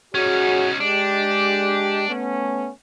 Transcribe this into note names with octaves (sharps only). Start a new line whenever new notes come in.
C#4 D#4 F#4 G#4 C#5
G#3 D4 G4
A3 B3 C#4